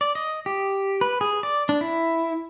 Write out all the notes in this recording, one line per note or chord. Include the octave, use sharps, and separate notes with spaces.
D5
D#5
G4
B4
G#4
D5
D4
E4